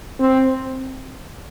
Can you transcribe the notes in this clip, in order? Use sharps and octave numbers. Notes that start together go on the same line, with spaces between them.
C4